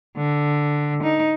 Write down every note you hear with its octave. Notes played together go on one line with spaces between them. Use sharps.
D3
D#4